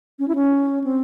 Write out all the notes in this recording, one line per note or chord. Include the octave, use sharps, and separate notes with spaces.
C#4
E4
C#4
C4